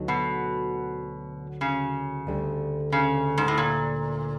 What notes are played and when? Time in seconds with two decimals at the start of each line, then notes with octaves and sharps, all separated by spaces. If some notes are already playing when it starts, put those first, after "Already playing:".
Already playing: D2 D3 F#3 B3 D#4
0.08 B2
1.61 C#3
2.27 D2 D3 G3
2.92 C#3
3.38 G#2
3.48 A2
3.58 A#2